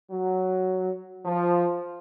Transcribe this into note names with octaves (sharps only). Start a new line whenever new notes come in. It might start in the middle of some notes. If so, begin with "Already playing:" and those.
F#3
F3